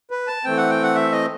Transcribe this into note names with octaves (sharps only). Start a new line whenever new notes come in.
B4
A5
E3 A3 C4 G5
F#5
G5
F#5
E5
D#5